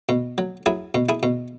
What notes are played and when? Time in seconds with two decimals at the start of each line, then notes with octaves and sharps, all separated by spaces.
0.09 B2
0.38 F#3
0.66 F#3 E4 G#4
0.95 B2
1.09 E4 G#4
1.23 B2